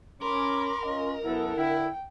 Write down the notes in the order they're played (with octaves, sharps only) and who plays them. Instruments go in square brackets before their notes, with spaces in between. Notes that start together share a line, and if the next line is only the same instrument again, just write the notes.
[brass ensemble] C#4 [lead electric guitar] A#4 [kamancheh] B5 D6 [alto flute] C6
[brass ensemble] C#4 F4 [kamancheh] D#5
[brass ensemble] F#2 B3 A4 [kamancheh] E4 [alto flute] F#5
[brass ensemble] D3 E4 [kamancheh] G5